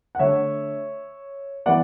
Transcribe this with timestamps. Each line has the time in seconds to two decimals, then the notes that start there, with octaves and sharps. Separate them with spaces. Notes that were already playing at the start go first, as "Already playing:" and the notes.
0.15 F#5
0.19 D3 A3 D4 C#5 E5
1.66 E3 B3 D5 F#5